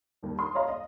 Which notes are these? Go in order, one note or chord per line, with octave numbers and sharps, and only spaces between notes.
D#2 G3
C6 D#6
C#5 D#5 F5 A#5 C6
D#5